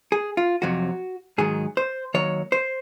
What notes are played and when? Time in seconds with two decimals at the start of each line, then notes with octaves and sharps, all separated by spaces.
0.12 G#4
0.37 F4
0.62 F2 C3 F#3 F#4
1.38 G#2 D#3 F#3 G#4
1.77 C5
2.14 D#2 D#3 F#3 C#5
2.52 C5